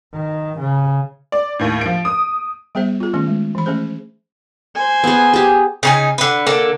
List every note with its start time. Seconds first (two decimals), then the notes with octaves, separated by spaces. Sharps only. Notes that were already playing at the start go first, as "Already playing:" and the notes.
0.13 D#3
0.59 C#3
1.32 D5
1.59 D#2 A2
1.81 F3 D7
2.05 D#6
2.75 G3 B3 G#4 C5 E5
3.00 F4 G#4
3.13 D#3 A3 C#4
3.27 G#3
3.55 E3 B5
3.66 A3 C#4 G#4 C5
4.75 C5 G#5
5.04 B3 G#4
5.33 G4 G#4
5.83 C#3 D#4 G#5
6.18 D3 B4
6.47 D3 A#3 A4